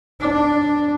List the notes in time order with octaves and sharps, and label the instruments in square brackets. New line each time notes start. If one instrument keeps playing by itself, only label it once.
[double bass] D4